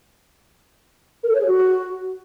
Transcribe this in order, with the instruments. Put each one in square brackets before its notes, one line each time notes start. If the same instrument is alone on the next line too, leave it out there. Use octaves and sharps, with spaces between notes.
[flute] A#4
A4
C#5
G#4
F#4